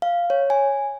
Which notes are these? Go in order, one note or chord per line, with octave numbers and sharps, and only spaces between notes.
F5
C#5
G#5